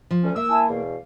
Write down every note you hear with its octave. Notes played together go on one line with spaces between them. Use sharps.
F3
D2 C#4
A#3 E6
E4 G#5 A5
E2 B2 F5